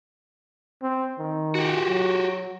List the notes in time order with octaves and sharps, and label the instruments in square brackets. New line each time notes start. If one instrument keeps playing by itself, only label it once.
[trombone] C4
D#3
[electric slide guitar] F#4 G4
[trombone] F#3